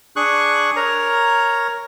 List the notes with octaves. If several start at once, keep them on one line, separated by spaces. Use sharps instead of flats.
D4 G#4 C#6 F#6
A#4 C#5 A#5